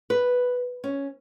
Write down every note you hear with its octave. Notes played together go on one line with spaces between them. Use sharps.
B4
C#4